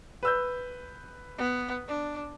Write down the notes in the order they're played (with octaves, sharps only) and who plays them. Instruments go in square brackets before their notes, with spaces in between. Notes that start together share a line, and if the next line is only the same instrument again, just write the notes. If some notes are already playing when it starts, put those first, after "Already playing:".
[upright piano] B4 E6 G6
[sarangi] B3
D4